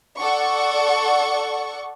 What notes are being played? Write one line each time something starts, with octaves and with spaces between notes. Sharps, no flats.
A4 D5 F#5 C#6